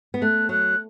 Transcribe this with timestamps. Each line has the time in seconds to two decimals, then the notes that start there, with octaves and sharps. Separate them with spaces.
0.14 B3
0.22 A3 F#6
0.49 F#3 F#6